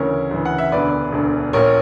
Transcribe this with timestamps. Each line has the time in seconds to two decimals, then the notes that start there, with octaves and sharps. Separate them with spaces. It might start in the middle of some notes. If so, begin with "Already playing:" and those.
Already playing: D2 C#3 E3 A#4 C#5
0.31 D2 C#3 E3
0.45 F#5
0.58 E5
0.72 E1 D2 D3 B4 D5
1.12 E1 D2 D3
1.53 A#1 A#2 A#4 C#5